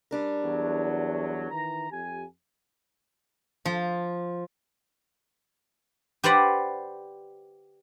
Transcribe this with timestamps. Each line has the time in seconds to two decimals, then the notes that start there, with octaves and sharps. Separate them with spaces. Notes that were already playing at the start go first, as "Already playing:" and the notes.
0.11 G3 D4 A#4
0.43 E2 F#3
1.50 D#3 E3 A#5
1.91 F2 G4 G#5
3.65 F3
6.24 G4 B4 C5 D5 F#5